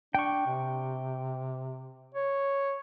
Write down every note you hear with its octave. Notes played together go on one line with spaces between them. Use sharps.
D4 G5 C#6
C3
C#5